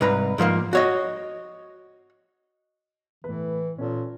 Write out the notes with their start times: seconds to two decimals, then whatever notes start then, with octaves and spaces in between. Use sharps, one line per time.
0.01 C2 G#2 B4 A#5
0.38 G#2 F3 A3 A#3
0.73 F#4 C#5 D#5
3.24 A2 E3 B4
3.78 A#2 C#4 A4